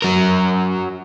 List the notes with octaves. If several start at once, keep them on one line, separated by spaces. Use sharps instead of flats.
F#3 A#4